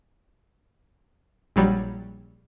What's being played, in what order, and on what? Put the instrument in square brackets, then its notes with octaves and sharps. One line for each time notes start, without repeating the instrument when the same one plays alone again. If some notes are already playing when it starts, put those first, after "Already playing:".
[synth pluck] A#1 F#3 G3